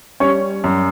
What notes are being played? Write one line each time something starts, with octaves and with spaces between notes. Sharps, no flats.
G3 C#4 C#5
F#2